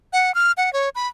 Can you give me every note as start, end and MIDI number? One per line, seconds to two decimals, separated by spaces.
0.13 0.34 78
0.35 0.52 89
0.57 0.72 78
0.73 0.89 73
0.95 1.08 83